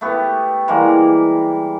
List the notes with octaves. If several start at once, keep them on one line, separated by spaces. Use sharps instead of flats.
A3 B3 G4
E3 G3 G#3 A#3